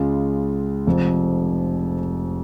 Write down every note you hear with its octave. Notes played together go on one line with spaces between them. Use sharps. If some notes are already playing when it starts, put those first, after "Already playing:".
Already playing: C#2 C#3 G#3 F4
F1 F2 F3